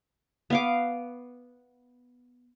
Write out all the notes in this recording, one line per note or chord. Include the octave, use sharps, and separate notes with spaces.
B3 F5 D6